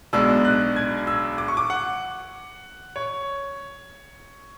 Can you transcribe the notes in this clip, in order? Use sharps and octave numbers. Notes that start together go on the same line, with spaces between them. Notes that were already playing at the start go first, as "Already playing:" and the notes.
B1 B2 G#3 D4 E6
F#6
G#6
E6
D6
C#6
D6
F#5
C#5